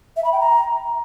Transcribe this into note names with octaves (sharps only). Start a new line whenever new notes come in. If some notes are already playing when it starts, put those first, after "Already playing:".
E5
B5
G5
A#5